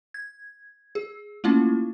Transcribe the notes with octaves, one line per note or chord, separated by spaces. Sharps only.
G#6
G#4
A3 A#3 C#4 E4 F4